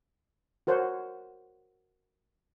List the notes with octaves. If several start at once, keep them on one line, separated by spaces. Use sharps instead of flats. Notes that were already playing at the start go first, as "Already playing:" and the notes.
F#4 A#4 C5 C#5 F#5